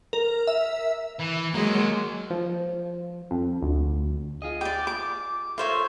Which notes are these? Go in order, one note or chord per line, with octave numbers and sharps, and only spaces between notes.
A#4
E5
E3
F#3 G#3 A#3 D#5
F3
F2
D2
F4 G#4 D#5
G4 D5
D6
F4 A4 A#4 C5 C#5 E5